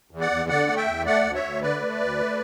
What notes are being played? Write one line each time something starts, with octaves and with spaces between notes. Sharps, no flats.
E2
D5 F#5
E2
D3 D5 F#5
A3
E5 G5
E2
A3 D5 F#5
D2
C#5 E5
D2
D3 B4 D5
A3
D2
A3